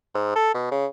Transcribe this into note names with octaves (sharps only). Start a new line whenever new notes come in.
G#2
A4
B2
C#3